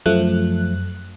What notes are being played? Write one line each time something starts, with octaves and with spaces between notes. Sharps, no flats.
F#2 F3 A3 F#6